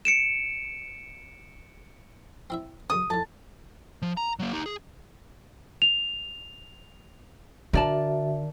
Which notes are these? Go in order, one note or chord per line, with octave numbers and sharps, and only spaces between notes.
C#7 D7 E7
C4 E4 E5
F#2 C#3 C#6 D#6
F2 A2 A5
F3
A#5
F#3 A#3
D#4 G4
G#4
F7
D3 F#4 A#4 D5 E5 A5